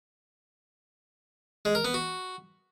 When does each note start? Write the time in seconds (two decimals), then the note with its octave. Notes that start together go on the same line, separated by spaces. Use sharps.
1.65 G#3
1.75 A#4
1.85 B3
1.94 F#4